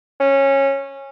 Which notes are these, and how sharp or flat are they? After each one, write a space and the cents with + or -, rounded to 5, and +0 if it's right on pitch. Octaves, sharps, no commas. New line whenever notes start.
C#4 -15